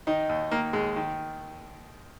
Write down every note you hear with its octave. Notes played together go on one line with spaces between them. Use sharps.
D#3 D#4
D#2
D#3 A#3
D#2 G#3
D#3